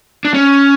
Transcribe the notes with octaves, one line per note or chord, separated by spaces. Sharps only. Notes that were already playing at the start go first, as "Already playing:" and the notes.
D4
C#4